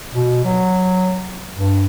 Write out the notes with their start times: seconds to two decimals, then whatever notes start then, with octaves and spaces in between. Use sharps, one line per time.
0.14 B2
0.44 F#3
1.54 G2